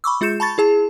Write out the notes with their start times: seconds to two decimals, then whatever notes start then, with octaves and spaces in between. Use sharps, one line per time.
0.04 B5 C#6 D6 E6
0.21 G#3 F4 G#4 G6 C#7 E7
0.40 A5 B5 C#6 A6
0.58 E4 G#4 A5